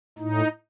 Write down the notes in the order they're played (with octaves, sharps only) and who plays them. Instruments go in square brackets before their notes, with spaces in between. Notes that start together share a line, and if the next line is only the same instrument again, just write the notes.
[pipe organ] A2 D#4